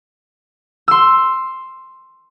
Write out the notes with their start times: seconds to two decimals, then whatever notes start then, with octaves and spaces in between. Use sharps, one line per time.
0.88 C6 E6